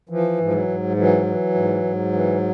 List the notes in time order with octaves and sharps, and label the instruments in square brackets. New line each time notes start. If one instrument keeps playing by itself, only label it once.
[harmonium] E3 F3
G#2 F3
F#3
G#2
E3 F#3
E3
G#2
G#2
E3